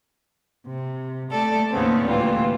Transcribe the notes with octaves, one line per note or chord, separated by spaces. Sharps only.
C3
A3 A4 D5
D#2 A2 C#3 B3 C4
D2 A#2 E3 G3 F4